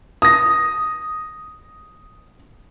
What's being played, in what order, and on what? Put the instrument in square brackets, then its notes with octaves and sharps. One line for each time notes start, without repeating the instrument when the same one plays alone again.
[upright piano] D#6 A#6